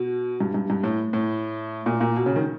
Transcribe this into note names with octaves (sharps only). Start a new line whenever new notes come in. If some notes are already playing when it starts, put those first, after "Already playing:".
Already playing: B2
G2
G2
G2
A2
A2
A#2
A#2
B2
C#3
D#3